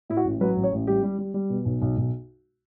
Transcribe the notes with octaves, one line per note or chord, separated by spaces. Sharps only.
A2 E4
F#4
A1
F#3 B4
A1
C#5
A1
G3 G4
G3
G3
G3
B2
B1
B1
B1